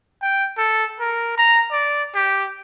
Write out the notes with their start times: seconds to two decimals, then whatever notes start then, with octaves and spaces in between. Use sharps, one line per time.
0.22 G5
0.58 A4
1.00 A#4
1.37 A#5
1.72 D5
2.15 G4